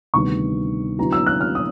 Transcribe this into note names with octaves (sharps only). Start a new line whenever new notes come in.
D2 C3 D#3 G3 B3 C#6
D3 F#3 B3 E4 A#5
E6
F#6
F6
D#6